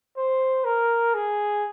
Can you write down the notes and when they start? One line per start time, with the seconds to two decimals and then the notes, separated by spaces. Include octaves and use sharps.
0.17 C5
0.65 A#4
1.14 G#4